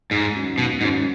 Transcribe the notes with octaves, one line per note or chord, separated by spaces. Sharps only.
D#2 G#2
D#3 F#3 C#4
D#2 B2
G#2 D#3 F#3 C#4